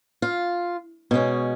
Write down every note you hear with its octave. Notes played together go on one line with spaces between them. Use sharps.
F4
B2 G#3 C#4